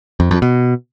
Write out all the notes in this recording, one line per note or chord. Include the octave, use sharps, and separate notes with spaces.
F2
F2
B2